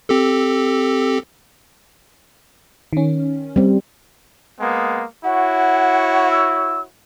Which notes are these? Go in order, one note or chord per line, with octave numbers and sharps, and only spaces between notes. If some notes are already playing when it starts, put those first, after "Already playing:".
C4 G4 A4
D#3 C#4
G3 C4
G#3 A#3 B3
E4 F#4 C#5 F#5
E6